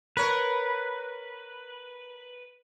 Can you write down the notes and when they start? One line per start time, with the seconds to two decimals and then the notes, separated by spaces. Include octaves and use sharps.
0.17 A#4 B4 C#5